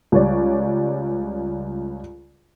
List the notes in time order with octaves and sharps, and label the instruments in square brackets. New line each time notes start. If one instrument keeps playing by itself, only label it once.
[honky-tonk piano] C#2 G3 C#5 D5